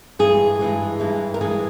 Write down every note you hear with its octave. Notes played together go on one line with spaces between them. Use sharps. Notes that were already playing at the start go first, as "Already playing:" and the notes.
G2 E3 G#3 G#4
G2 E3 G#3
G2 E3 G#3
A#4
G2 E3 G#3 G#4